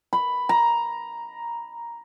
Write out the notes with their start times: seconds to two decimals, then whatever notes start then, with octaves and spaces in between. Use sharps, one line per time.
0.13 B5
0.49 A#5